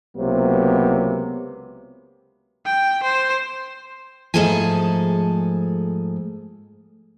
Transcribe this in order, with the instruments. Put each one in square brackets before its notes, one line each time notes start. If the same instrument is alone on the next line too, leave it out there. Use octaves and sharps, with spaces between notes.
[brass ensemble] C#2 C3 F#3 A#3 B3
[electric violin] G5
C5
[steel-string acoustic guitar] G#2 F3 A3 G#4 A4 G#5